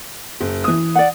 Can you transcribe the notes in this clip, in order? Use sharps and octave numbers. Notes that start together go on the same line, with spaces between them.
F#1
E3 D#6
D5 F#5